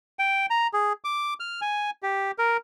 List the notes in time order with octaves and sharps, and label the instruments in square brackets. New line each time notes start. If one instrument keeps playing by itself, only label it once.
[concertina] G5
A#5
G#4
D6
F6
G#5
G4
A#4